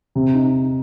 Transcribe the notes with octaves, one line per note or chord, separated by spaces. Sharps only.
C3
D#4